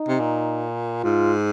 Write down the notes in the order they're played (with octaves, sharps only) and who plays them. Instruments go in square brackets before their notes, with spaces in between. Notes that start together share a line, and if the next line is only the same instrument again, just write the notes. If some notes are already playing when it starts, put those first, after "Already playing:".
Already playing: [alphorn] D#4
[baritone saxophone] C3
A#2
[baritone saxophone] G#2 [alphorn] F4